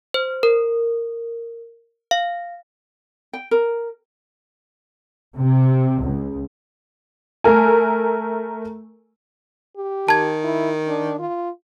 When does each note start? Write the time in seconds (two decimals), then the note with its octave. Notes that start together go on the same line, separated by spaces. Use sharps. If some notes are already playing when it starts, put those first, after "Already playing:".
0.14 C5
0.43 A#4
2.11 F5
3.33 G5
3.51 A#4
5.37 C3
6.03 C#2
7.44 A3 A4 A#4 G#5
9.77 G4
10.08 D#3 A5 G#6
10.44 E4
10.88 D4
11.19 F4